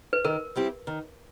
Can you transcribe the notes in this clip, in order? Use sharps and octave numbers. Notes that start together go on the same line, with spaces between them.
B4
D#3 A#4
G3 C4 E4 G4
D#3